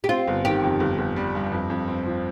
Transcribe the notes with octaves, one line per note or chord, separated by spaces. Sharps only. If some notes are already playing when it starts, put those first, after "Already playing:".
G4
C4 F4
G1
D#3 G4
F2
G1
G1
G3
G2
F2
F2
C4
F3